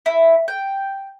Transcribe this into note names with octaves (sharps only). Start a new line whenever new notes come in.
E4
G5